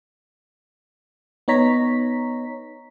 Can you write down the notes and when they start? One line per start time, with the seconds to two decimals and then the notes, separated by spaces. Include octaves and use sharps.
1.48 B3 D#4 C#5 A#5 B6